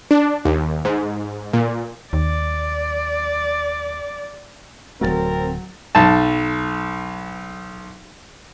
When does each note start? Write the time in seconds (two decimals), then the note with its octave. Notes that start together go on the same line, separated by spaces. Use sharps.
0.11 D4
0.45 D#2
0.85 G#2
1.53 A#2
2.13 D#2 D5
5.01 D1 F2 F#3 A3 C4 A#4 A6
5.95 B1 A5